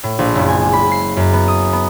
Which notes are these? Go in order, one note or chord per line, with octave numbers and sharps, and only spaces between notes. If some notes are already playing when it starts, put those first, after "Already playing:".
A2
A#1
F#1
G#5
G#3
B5
C7
F#2
B3
D#6
B3